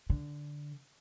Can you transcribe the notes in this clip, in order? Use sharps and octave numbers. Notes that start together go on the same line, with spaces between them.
D3